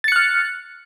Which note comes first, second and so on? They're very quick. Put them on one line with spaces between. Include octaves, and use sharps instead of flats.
A6 C#7 F#6 F6